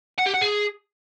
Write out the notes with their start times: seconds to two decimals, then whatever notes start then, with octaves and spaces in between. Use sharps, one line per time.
0.19 F#5
0.27 G4
0.34 F#5
0.42 G#4